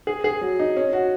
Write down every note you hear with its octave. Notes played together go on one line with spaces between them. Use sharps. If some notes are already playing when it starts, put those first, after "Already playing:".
G#4
G#4
F#3
D#4
C#4
F#4